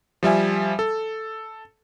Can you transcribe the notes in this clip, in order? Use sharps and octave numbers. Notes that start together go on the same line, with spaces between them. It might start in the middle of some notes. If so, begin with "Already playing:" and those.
F3 G3 E5 G#5
A4